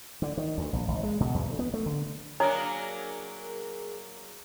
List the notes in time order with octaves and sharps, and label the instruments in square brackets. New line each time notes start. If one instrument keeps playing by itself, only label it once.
[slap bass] D3
D#3
D2
A#1
G#1
G#3
B2
E2
D2
B3
A3
D3
[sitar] F#3 A#3 D4 [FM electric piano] G#4 A#4 [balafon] C#5 [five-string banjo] A#5